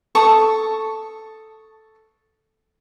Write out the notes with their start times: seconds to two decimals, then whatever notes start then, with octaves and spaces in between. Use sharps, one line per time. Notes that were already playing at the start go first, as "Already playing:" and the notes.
0.15 A4 C#6 D#6